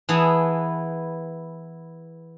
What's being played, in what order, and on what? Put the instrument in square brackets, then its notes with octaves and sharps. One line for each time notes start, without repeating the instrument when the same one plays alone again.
[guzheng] E3 B3 G#4 A5